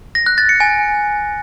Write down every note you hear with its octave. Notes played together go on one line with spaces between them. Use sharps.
A#6
F#6
A6
C#7
G#5